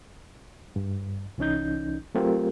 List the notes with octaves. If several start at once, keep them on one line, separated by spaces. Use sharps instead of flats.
G2
C2 E3 C#4 D#4 G6
F#3 A3 C4 F4 G4 A#4